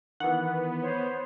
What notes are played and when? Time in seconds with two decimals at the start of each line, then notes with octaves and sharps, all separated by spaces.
0.20 D#3 E3 B3 F#5
0.82 C5 C#5